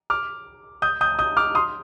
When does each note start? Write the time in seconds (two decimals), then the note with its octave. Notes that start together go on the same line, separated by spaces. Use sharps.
0.10 D6 F6
0.82 D#6 G6
1.01 D#6 G6
1.19 D#6 G6
1.37 D6 F6
1.55 C6 D#6